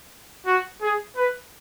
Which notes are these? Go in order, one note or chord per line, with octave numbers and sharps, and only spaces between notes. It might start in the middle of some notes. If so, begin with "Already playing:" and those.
F#4
G#4
B4